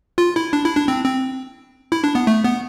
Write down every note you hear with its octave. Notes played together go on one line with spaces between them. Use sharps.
F4
E4
D4
E4
D4
C4
C4
E4
D4
B3
A3
B3